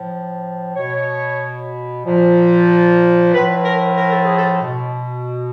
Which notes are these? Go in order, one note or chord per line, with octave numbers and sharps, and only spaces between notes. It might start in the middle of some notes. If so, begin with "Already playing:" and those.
Already playing: A2 F3
B2 C#5
A#2 F3
A2 F3 B4
A#4
A#4
A4
G#4
A4
B2